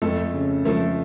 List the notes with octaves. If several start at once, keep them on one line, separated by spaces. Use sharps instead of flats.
F2 A3 A4
C#3
F3 A3 A4